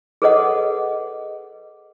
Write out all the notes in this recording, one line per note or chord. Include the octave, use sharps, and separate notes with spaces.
G#4 A4 B4 C#5 D#5 F#5